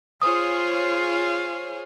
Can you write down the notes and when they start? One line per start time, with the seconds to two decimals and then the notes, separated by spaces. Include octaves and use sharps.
0.22 F4 G#4 C5 C#5 F5 D#6